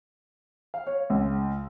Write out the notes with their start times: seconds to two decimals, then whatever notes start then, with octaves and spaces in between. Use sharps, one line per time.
0.74 F5
0.87 C#5
1.10 C#2